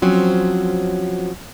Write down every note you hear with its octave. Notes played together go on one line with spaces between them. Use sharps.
F3 F#3 C4 C#4